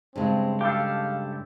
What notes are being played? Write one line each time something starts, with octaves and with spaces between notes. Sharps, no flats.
G2 C#3 G#3 C4
G4 A4 F5